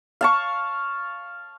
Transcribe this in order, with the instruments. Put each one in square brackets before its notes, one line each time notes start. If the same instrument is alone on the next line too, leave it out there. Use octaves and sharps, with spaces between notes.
[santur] F5 A5 C#6